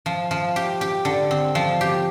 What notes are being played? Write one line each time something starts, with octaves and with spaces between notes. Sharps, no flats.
F3
F3
G4
G4
D3
C4
F3
G4